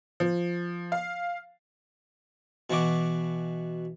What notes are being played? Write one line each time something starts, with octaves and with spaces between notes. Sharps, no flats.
F3
F5
B2 E3 F#4 D6